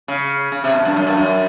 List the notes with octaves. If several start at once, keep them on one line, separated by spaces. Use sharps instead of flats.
C#3
C#3
C3
B2
G2
F#2
G2
F#2